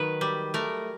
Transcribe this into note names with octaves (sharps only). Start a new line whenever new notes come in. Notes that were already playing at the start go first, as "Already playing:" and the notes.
Already playing: D#3 F#3 B4
G3
A3 A#4